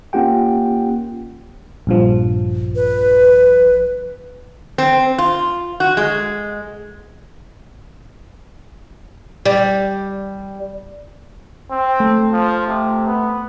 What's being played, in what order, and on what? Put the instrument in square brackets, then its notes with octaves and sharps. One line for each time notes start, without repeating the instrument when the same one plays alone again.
[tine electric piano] A#3 C#4 F4 G4 F#5 G5
[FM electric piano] A#1 G2 F3
[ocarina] B4
[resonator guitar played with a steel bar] C4
F4
F#4
G#3
[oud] G3
[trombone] C4
[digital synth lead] A3
[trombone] F3
C3
B3